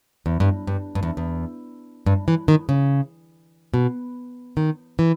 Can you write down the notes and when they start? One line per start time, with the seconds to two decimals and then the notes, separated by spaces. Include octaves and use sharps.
0.26 E2
0.40 G2
0.67 G2
0.95 G2
1.03 E2
1.17 E2
2.06 G2
2.28 E3
2.48 D#3
2.69 C#3
3.74 B2
4.57 D#3
4.99 E3